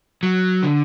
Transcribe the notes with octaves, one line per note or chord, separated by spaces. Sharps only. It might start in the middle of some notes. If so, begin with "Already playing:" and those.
F#3
D3